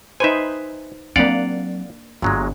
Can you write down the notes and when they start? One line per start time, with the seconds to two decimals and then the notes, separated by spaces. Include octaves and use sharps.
0.20 D#4 B4 C5 E5 G#5
1.16 F#3 A#3 C4 D4 D5 F5 F#5
2.22 G1 A#2 F#3 G#3